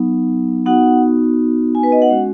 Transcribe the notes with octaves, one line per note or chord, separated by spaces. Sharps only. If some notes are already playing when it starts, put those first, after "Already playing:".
Already playing: F#3 B3 D#4
B3 D#4 F#4 F#5
G#5
B4
D#5
F#5
G#3 C#4 F#4